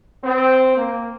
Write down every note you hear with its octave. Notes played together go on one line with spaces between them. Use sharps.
C4
A#3